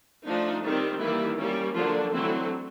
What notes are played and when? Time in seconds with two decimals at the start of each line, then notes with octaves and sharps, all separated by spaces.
0.26 F3 A3 D4 D#4
0.63 D#3 G3 C4
1.00 D#3 E3 G3 A#3 E4
1.38 G3 A#3 C#4
1.75 D3 F3 F#3 A#3 D4 F4
2.13 D3 E3 F#3 A3 C4 E4